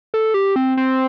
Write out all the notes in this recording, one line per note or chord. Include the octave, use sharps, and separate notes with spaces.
A4
G4
C4
C4